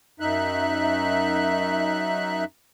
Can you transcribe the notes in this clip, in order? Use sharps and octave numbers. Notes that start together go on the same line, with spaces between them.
F#2 D#4 E5 F#6